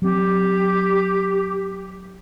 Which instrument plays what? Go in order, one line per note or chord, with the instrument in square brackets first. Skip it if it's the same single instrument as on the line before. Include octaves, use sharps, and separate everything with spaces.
[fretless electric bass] F#3 C4 [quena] G4